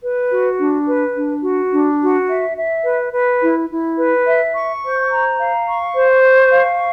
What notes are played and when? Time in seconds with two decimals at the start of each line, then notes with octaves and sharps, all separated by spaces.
0.03 B4
0.31 F#4
0.59 D4
0.87 B4
1.15 D4
1.43 F#4
1.72 D4
2.00 F#4
2.29 E5
2.56 E5
2.84 B4
3.13 B4
3.41 E4
3.69 E4
3.98 B4
4.27 E5
4.55 C#6
4.83 C5
5.10 A#5
5.39 F5
5.68 C#6
5.95 C5
6.23 C#6
6.52 F5